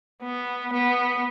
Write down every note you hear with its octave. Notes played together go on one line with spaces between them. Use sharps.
B3
B3